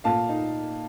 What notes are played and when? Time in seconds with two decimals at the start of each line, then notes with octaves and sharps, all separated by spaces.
0.04 A#2 F5 A5
0.29 D#4